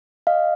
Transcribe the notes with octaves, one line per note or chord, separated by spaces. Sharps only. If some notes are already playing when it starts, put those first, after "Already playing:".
D#5 F5